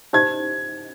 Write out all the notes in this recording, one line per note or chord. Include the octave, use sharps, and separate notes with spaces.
D#4 G4 C5 G#6